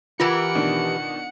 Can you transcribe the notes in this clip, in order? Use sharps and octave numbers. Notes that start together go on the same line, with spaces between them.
E3 F4 G4 A#4 F#5 C#7
B2 D#3 D4